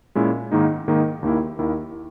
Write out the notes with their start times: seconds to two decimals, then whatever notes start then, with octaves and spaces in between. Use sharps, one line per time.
0.15 A#2 G#3 C#4 E4
0.51 G#2 D#3 A#3 D#4
0.88 G#2 D#3 A#3 D#4
1.23 D#2 D#3 A#3 E4
1.59 D#2 D#3 A#3 E4